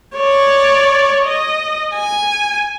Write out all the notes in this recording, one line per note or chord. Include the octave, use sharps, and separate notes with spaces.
C#5 D5
D#5
G#5